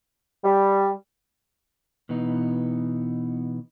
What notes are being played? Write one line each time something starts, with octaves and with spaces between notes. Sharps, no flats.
G3
B2 E3 B3 D#4